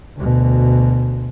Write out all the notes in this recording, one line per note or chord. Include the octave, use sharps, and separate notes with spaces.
D2 B2